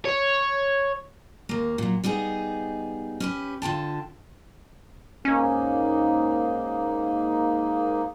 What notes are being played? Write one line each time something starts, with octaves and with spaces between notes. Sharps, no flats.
C#5
D#2 A#3
A#2 F#3
G3 B3 D#4 G#4
C#4 G4 B4
D3 F4 G5 A5
G#2 A#3 C#4 D#4